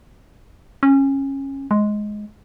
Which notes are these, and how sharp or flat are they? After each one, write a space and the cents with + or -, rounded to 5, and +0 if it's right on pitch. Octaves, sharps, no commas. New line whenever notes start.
C#4 -20
G#3 +10